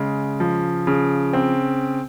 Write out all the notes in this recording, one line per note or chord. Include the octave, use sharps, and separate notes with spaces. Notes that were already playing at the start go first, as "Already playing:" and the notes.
Already playing: C#3 G#3
F3
C#3
C4